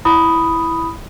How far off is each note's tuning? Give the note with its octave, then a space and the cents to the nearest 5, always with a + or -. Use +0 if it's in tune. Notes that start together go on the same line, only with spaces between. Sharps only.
E4 +0 B5 +0 D#6 +0